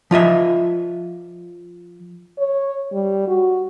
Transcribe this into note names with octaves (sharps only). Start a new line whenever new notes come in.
F3 F4 D#5 E5
C#5
G3
F#4